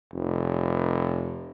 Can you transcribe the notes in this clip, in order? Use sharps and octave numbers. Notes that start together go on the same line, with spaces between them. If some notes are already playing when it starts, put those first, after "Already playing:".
F1